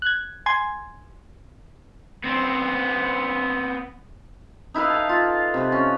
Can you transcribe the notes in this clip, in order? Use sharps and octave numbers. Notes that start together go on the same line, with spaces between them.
F#6 G#6
G#5 C6 G#6
B3 C4
D#4 E4 B4 F5
A4
F4
C3 B4
C#4